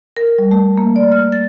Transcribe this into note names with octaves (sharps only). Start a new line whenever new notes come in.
A#4
G3
A3
A#3
D5
F6
A6